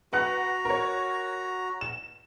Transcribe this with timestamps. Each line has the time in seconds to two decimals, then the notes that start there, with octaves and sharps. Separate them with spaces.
0.13 F#4 B4 F#5 A#5 F#6
0.65 A#4 C#5
1.81 E7